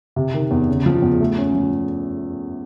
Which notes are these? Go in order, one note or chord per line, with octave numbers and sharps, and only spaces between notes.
C3
D#3
E2
C#3
F3
E2
A3
C#4
F3